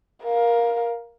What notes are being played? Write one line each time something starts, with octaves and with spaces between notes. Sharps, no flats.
A#4 F5